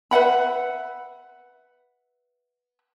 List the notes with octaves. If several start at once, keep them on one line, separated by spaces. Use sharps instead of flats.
B4 E5 F#5 B5